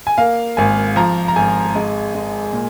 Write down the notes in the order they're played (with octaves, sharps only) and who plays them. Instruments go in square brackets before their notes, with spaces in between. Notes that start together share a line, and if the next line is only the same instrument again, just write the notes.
[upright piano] G#5
A#3 F5
G#1 G#5
F3 A#5
A#5
G#1 G#5
G#3
G#3
A#2